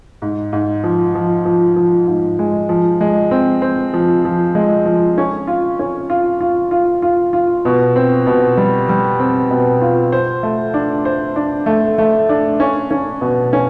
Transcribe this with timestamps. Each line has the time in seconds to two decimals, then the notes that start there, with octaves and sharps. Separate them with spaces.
0.22 G#2
0.53 G#2
0.84 F3
1.15 F3
1.45 F3
1.76 F3
2.07 G#2
2.39 G#3
2.69 F3
3.01 G#3
3.31 C4
3.62 C4
3.94 F3
4.25 F3
4.55 G#3
4.86 F3
5.18 C#4
5.47 F4
5.79 C#4
6.10 F4
6.41 F4
6.71 F4
7.02 F4
7.33 F4
7.65 B2
7.96 C4
8.27 B2
8.57 G3
8.89 G3
9.20 C4
9.50 B2
9.82 F4
10.12 C5
10.43 A3
10.74 D4
11.05 C5
11.36 D4
11.66 A3
11.98 A3
12.29 D4
12.60 C#4
12.91 C#4
13.21 B2
13.53 C#4